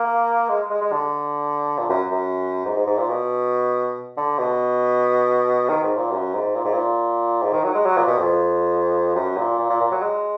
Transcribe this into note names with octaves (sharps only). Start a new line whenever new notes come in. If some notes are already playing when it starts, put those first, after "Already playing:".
Already playing: A#3
G#3
G#3
G#3
D3
A#2
F#2
F#2
G#2
G#2
G#2
A#2
B2
D3
B2
D#3
G#2
A#2
F#2
G#2
A#2
G#2
A#2
G#2
D#3
F#3
G#3
F#3
A#2
B2
F2
F#2
A#2
A#2
A#2
A#2
F#3
G#3